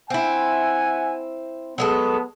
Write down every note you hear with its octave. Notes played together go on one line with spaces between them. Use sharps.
C4 E4 E5 F#5 G#5
F#3 G#3 B3 A4